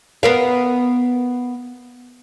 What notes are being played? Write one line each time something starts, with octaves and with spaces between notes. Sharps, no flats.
B3 A#4 F5